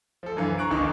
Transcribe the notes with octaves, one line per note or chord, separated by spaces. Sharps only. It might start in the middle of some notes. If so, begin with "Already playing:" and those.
F3 A4
F#2 D3 E3 F5
A#5 C#6 F#6 D7
G1 D2 D#3 D4 C#6